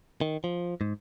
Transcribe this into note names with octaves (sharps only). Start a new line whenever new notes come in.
D#3
F3
G#2